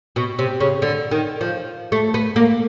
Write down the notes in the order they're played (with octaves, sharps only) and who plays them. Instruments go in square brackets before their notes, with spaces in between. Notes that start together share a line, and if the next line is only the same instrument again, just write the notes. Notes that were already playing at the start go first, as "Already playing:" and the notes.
[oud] B2
C3
C#3
D3
D#3
F3
A3
B3
A#3